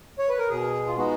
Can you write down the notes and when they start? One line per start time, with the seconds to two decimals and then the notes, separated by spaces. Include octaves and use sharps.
0.19 C#5
0.29 B4
0.39 A#4
0.49 B2 G#4
0.87 F4
0.96 G#3 B3 D#4 F#4